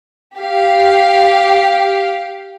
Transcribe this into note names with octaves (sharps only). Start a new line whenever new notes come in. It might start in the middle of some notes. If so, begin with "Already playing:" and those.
G4 F5